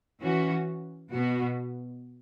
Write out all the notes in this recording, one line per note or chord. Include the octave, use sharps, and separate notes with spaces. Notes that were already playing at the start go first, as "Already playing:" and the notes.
E3 C#4 F#4
B2 B3 F#4